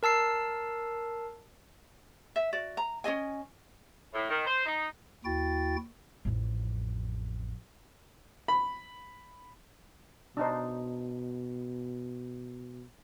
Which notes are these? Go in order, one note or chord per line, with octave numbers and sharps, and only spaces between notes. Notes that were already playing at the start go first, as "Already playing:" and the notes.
A#4 A5 E6 C7
E5
F#4 D5
A#5
C#4 G#4 D#5 G#5
A2
D#3
C5
D#4
D#2 E4 F#4 G5 A6
A1 F2
B5
B2 D4 D#4 C5